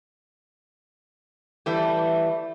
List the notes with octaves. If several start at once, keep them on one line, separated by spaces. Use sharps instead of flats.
E3 G3 A3